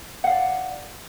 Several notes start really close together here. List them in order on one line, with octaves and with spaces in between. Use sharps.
F#5 F5 D5